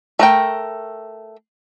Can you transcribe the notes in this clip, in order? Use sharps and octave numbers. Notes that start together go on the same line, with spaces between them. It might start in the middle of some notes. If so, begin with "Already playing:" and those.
A3 A#4 G5